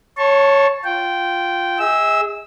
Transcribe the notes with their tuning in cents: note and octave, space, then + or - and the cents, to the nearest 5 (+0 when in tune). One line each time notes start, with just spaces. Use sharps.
C#5 +0 A5 +0 C#6 -40
F4 +0 G5 -10
G#4 -20 D#5 +45 E6 -10